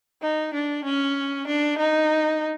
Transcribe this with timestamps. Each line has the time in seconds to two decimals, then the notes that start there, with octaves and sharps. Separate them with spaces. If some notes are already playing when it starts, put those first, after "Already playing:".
0.22 D#4
0.54 D4
0.85 C#4
1.47 D4
1.78 D#4